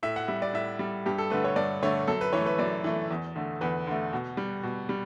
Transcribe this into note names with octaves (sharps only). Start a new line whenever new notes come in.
A2 E5
F#5
G3 E5
D5
A2 E5
G3
G2 G4
A4
D3 A3 B4
C#5
G2 D5
D3 A3 C#5
F#2 A4
B4
E3 A3 C#5
B4
F#2 D5
E3 A3
E2
D3 A3
E2 B4
D3 A3
B2
G3
B2
G3